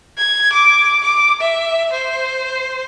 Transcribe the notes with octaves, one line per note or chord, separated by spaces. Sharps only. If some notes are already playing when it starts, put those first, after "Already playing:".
G#6
D6
D6
E5
C5